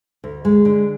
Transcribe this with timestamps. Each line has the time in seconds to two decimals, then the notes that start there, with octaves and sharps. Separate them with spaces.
0.24 D2
0.45 G#3
0.65 D3